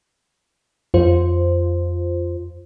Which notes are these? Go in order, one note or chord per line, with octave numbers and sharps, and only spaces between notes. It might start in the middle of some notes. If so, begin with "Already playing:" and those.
F2 F4 C5